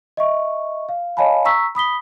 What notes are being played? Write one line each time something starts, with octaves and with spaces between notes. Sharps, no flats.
D#5 E5 C#6
F5
C#5 D#5 F5 G#5 A5 B5
A#5 C#6 E6 B6
B5 D#6 B6 G7